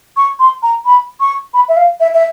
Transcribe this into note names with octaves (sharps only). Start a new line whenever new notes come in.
C#6
C6
A#5
B5
C#6
B5
E5
F5
E5
E5